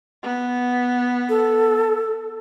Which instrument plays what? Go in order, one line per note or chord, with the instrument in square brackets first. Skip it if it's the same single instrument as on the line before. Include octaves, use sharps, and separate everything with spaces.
[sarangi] B3
[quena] A4